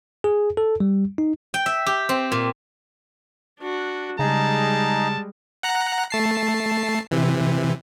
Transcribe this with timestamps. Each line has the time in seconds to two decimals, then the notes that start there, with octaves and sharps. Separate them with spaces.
0.24 G#4
0.57 A4
0.80 G3
1.18 D#4
1.54 G5
1.66 E5
1.86 G4
2.09 C4
2.32 A#2
3.59 D4 F#4
4.19 C#3 G3 G#3 D#4 G#4 A5 A#5
5.63 F#5 A#5 F#6
6.10 A3 A5 C7
7.11 C3 E3